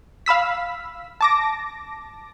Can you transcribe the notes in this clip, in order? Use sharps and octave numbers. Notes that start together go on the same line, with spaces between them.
F5 B5 E6 B6
A5 D6 A#6